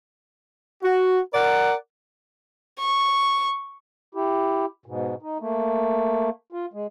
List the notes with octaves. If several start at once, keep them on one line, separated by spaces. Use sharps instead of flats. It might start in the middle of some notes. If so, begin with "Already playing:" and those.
F#4
A#4 D5 F#5
C#6
E4 G4
G#2 B2
D#4
A3 A#3
F4
G#3